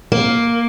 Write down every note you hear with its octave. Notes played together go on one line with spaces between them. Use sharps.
A#3